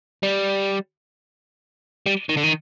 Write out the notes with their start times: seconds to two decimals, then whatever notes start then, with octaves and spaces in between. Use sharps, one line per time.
0.23 G3
2.06 G3
2.29 D#3
2.37 D3
2.43 D#3